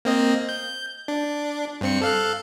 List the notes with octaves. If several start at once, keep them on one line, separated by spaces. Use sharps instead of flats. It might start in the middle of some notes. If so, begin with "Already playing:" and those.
A#3 C4 D#5
G6
D4
G2 C4 C#7
A4 F5 F#6